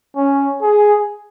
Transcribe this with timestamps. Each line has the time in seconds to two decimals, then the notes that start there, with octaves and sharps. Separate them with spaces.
0.16 C#4
0.62 G#4